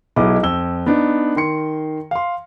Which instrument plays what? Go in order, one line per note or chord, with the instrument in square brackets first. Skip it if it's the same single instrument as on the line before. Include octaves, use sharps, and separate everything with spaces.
[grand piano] B1 B3 E4 G#4 D#5 D6
F2 E6 G7
B3 D4 D#4
D#3 C6 C#7
F5 C6